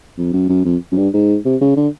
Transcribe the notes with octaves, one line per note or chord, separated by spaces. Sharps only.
F2
F#2
F#2
F2
F#2
G2
G#2
C3
C#3
D3